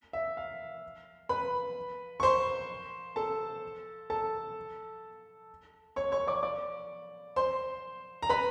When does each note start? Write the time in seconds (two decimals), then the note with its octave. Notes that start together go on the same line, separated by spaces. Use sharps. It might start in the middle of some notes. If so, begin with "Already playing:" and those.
0.13 E5
0.37 F5
1.29 B4 B5
2.20 C#6
2.23 C5 C6
3.16 A4 A5
4.10 A4 A5
5.96 C#5 C#6
6.12 C#5 C#6
6.27 D5 D6
6.43 D5 D6
7.36 C5 C6
8.22 A#5
8.29 B4 B5